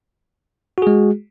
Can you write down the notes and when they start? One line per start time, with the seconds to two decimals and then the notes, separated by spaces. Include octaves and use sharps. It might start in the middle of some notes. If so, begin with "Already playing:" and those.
0.78 F#4
0.82 G#4
0.87 G#3